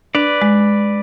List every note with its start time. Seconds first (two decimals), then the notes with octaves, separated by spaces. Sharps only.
0.15 D4 B4 D5
0.42 G#3